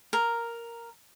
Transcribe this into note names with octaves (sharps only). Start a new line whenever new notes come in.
A#4